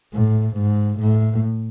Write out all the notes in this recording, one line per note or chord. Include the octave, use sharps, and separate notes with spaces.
A2
G#2
A2